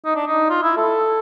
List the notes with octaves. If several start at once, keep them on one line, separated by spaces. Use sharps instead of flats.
D#4
D4
D#4
F4
E4
A4